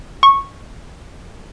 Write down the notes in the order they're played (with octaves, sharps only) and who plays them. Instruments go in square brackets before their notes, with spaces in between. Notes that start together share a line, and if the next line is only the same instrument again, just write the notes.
[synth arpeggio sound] C#6